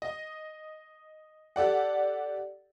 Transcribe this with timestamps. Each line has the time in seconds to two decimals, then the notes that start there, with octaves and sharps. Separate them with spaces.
0.02 D#5
1.56 G4 A4 D5 F#5